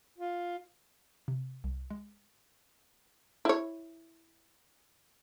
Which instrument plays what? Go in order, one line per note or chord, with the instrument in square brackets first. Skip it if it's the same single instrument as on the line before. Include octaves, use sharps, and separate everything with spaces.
[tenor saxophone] F4
[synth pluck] C3
C2
G#3
[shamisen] E4 C#5